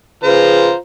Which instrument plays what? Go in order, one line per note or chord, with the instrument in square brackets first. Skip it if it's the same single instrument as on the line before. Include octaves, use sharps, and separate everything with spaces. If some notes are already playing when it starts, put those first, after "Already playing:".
[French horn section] C#3 G#4 B4 [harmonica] F4 C5 A#5